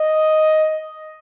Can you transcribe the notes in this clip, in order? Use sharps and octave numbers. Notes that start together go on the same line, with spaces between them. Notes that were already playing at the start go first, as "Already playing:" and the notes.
Already playing: D#5